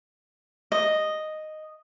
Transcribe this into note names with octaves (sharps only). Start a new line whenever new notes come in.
D#5